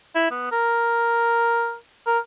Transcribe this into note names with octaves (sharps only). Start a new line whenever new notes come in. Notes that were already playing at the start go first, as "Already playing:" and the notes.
E4
B3
A#4
A#4